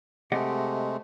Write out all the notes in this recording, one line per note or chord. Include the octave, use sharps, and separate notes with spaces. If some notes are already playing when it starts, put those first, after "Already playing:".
C3 G#3 A3 G4 D#5 F#5